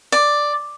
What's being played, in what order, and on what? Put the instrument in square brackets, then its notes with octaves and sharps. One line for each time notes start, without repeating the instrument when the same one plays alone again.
[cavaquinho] D5